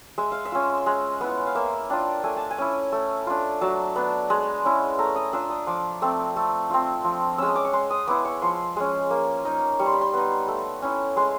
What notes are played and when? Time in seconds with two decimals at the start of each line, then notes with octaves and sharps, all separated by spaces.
0.18 G#3 E5
0.32 F5
0.45 E5
0.52 C#4 F4
0.86 G#3
1.21 B3 E4
1.47 F5
1.55 A#3 E5
1.90 D4 F4 G5
2.24 A3 G#5
2.37 A5
2.50 G#5
2.58 C#4 E4
2.92 A3
3.27 D4 F4
3.61 F#3 A5
3.96 B3 D4
4.30 G#3
4.65 C#4 E4
4.98 A3 A#5
5.16 D#6
5.33 D4 F4 E6
5.50 D#6
5.67 F3 D6
6.02 A3 C4
6.36 A3
6.70 C4 F4
7.04 F3
7.38 G#3 C#4 E6
7.47 D#6
7.56 D6
7.65 C#6
7.73 G#3 C6
7.90 D#6
8.08 B3 E4 D6
8.25 C#6
8.42 F3 C6
8.76 G#3 C#4
9.10 A#3
9.45 D#4
9.79 G3 C#6
9.86 C6
9.94 B5
10.01 C6
10.14 B3 D#4
10.48 A3
10.82 C#4 E4
11.16 G#3 C6